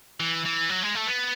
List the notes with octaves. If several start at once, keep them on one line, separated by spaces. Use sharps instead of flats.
E3
E3
F#3
G#3
A3
B3